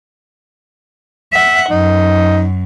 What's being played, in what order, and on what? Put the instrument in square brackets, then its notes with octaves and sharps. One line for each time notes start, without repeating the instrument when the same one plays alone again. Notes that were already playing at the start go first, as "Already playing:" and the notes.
[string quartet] E5 F#5
[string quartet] F#2 [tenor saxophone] D#4